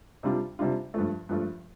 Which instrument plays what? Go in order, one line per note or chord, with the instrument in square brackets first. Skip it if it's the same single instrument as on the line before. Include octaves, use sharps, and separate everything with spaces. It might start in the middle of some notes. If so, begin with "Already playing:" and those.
[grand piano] C3 G3 D4 F4
C3 G3 D4 F4
G2 F3 A3
G2 F3 A3